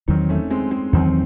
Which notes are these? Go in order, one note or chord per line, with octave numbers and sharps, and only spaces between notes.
E2 D#3 F#3 C4 D#4
A3 C#4
G#3 C4
G#3 C4
E2 D#3 F#3 C4 D#4